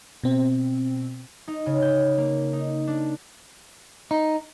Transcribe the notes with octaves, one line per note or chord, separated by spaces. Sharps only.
B2 C4
D#4
C#3
G6
A#3
D#4
D4
D#4